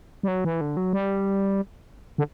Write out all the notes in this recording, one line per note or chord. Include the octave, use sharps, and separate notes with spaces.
G3
F#3
E3
D3
F#3
G3
D3